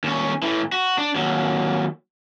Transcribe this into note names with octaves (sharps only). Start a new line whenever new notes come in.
D#2 C#4
A2 E3
F#4
D4
D#2 F#3